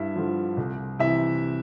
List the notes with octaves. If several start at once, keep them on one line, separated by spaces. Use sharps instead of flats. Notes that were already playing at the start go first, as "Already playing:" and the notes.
Already playing: G2 E4 E5
D3 F3
C2
C3 E3 E4 E5